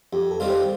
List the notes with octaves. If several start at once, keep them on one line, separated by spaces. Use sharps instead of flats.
F2 G4
A4
D#3 G3 C4 F4
C5